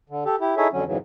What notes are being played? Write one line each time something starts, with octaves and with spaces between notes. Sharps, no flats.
D3
G4 A4
E4 G4
D#4 E4 G#4 A4 C#5 E5
F2 D3 F#3 C#4
F2 G#2 C#3 E3 F#3